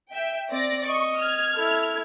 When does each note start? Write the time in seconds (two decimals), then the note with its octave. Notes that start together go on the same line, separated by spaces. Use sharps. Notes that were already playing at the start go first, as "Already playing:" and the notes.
0.12 E5 G5
0.51 C4 D5 A#6
0.87 D#5 C#6
1.19 F6 G#6
1.54 E4 A4